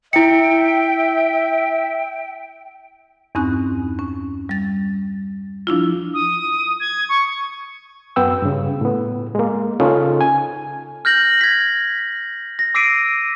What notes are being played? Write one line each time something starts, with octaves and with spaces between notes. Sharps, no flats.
E4 E5 G5 C#7
E2 G2 C4 C#4 D#4 F#6
C#4
G3 A6
F3 D4 E4 F4
D#6
G#6
C#6
F#2 B3 G5 E6
G2 C#3
A2 B3
G#3 A#3
C#3 C#4 D#4 F4 A4
G#5
F6 G6 A#6 F#7
G#6 B6
A#6
D6 E6 B6 C7 D7 D#7